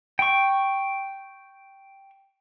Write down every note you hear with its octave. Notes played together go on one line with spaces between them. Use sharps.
G5 C#6